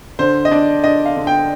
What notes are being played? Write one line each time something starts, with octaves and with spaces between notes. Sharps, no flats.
D3 C5
D#5
D4 D5
D4 D#5
F5
D3
G5